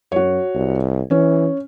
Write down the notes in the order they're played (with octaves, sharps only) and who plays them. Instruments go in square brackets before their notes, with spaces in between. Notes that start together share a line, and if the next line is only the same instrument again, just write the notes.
[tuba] F#2 [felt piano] F#4 C#5
[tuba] C2
[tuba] E3 [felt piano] C#4